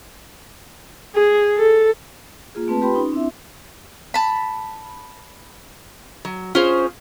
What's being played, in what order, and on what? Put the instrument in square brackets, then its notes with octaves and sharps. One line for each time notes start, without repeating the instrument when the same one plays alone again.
[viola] G#4
A4
[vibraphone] A#3 F4 G#4
A3 C4 B4 A5
F4 G4 B4 G5 B5 C6
C#4 D#4
C4 D4 E4 E5
[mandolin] A5 B5
[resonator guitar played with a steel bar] F#3
[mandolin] C#4 C5 [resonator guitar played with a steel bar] F4 G#4